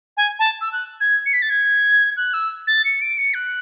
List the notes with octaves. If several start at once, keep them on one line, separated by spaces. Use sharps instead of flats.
G#5
A5
E6
F#6
G#6
C#7
B6
A6
G#6
F#6
E6
A6
C#7
D7
C#7
F#6